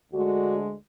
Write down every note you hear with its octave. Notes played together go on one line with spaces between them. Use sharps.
D2 D3 G#3 F#4